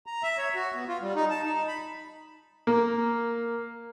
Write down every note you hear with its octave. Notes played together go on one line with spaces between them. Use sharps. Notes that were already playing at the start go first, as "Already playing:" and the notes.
A#5
E5
C#5
F#4
B3
F4
G3
D#4
A5
D#4
B5
A#3